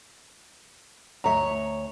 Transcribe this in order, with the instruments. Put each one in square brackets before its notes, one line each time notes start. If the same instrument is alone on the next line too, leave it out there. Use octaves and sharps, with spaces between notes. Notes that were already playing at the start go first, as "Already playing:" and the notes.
[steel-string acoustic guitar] D2 C#5 [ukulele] E5 A#5